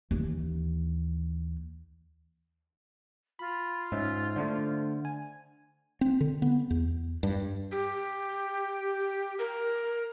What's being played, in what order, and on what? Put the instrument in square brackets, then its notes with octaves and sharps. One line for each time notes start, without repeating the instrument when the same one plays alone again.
[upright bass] D#2 E3
[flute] F4 [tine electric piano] B5
[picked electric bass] G#2 [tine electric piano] C#4 E5
[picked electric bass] D3 [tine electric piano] A3 D4 C5
[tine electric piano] G#5
[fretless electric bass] C4
D3
B3
E2
G2
[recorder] G4
A#4